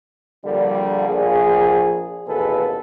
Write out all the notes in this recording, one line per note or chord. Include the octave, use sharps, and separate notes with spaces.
A#1 D3 G3
A#1 G#4
A1 D#2 B2 G#4 A4 B4